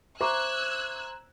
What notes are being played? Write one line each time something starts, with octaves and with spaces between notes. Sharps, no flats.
C5 E5 A#5 C#6 D6 E6 F#6 G#6